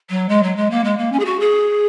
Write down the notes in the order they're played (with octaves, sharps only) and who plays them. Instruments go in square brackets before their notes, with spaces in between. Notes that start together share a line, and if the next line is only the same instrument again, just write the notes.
[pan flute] F#3
G#3
F#3
G#3
A#3
G#3
A#3
C#4
G#4
F#4
G#4